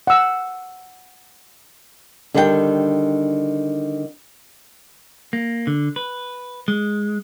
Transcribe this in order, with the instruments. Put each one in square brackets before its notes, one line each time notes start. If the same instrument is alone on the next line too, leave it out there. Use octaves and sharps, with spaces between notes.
[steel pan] F#5 E6
[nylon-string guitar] D3 D#3 G3 D4 F4 G5
[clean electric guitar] A#3
D3
B4
G#3